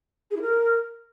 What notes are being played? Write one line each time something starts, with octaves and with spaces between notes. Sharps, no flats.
G#4
E4
A#4